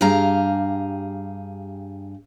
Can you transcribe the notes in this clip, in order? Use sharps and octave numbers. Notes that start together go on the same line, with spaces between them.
G2 G4 G#4 F5 A#5